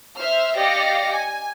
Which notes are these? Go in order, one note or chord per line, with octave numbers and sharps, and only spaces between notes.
C5 E5 F6
G4 D5 D#5 F5 A#6 C#7
G#5